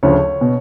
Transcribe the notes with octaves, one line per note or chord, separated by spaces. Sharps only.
D2 C#3 F3 C#5
B2